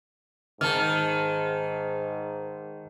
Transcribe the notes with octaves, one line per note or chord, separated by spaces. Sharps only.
G#2 D#3 A5 F6